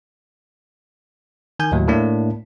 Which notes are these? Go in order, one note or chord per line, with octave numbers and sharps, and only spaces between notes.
D#3 G#5 G6
D#2 A2 F#3
A2 A#3 D4